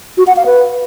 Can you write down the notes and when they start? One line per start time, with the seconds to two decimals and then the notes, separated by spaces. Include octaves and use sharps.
0.18 F#4
0.27 F#5
0.36 F5
0.46 B4